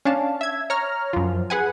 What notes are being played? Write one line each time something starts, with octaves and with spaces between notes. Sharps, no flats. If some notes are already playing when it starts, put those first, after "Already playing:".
C#4 D4 F5 A5
E5 G#6
C#5 A#5 F6
F#2 F3
G#4 B4 F#5 G#5